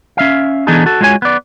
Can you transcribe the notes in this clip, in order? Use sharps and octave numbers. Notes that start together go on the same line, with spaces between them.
C#4 E5 F5
E3 B3 D4 D#4 G#4 A4
F#4 A4
G#3 F4 F#4 C#5 G#5
B3 D5